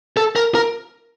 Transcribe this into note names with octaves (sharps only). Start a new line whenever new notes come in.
A4
A#4
A#4